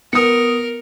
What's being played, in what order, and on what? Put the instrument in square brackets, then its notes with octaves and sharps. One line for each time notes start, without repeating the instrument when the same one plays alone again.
[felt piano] B3 [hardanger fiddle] A#4 [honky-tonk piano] D#6 C#7